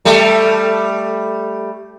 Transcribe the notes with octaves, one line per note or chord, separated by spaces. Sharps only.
G3 A3